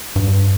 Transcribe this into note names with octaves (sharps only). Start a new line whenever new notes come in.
G2